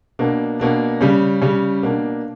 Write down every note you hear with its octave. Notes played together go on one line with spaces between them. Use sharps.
B2 A#3 D4
B2 A#3 D4
C#3 G3 C#4
C#3 G3 C#4
B2 A#3 D4